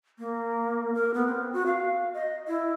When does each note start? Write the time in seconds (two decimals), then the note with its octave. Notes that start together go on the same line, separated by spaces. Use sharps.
0.19 A#3
0.95 A#4
1.14 B3
1.27 C4
1.53 F#4
1.66 F5
2.14 D#5
2.48 E4